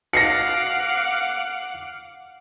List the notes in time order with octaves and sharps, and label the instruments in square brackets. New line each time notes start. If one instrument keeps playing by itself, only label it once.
[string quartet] F5 F#5 D6 [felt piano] A#6 C7 C#7